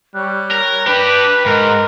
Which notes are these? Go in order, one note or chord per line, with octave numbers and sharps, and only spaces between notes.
G3 C#5 C#6 F#6
A#4
D4 G4 B4 G5 B5
G#2 A#4 D#5